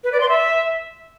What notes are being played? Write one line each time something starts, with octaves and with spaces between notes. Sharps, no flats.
B4
D5
C6
E5